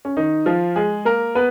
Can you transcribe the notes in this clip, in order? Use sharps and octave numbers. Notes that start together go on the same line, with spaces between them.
C#4
D#3 D#4
F3 F4
G#3 G#4
A#3 A#4
B3 B4